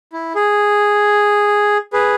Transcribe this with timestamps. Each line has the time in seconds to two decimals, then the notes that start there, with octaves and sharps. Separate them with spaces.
0.13 E4
0.35 G#4
1.93 G#4 B4